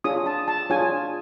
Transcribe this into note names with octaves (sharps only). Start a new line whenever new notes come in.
D4 F4 G#4 C#5 D#6
A5
A5
D4 F4 G#4 C#5 G#5